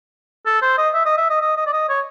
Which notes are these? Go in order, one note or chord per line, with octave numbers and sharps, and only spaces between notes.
A4
C5
D#5
E5
D#5
E5
D#5
D#5
D#5
D5
D#5
C#5